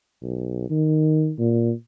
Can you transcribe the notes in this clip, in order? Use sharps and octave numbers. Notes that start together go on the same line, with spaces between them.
B1
D#3
A#2